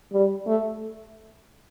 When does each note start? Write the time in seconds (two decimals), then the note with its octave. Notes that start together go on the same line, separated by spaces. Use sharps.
0.13 G3
0.47 A3